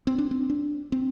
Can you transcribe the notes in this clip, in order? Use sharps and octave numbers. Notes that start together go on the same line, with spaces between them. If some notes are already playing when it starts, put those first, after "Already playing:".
C4
D4
C4
D4
C4